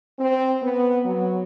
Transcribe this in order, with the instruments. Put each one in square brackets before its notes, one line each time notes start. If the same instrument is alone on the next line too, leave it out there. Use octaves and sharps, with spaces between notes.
[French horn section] C4
B3
F#3